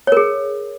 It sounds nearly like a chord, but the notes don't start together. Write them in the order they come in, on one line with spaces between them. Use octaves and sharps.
C#5 A#4 G#4